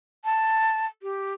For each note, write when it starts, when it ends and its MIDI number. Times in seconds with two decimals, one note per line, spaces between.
0.25 0.86 81
1.03 1.33 67